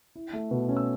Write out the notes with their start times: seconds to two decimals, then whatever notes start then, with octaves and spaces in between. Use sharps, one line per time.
0.16 E4
0.33 A3
0.51 B2
0.69 C#4
0.77 E6